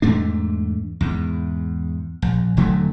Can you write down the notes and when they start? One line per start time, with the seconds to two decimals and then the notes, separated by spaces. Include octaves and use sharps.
0.02 E2 G#2 A3 D4
1.01 E2 G#2
2.22 A#1
2.57 E1 D3 F#3 A3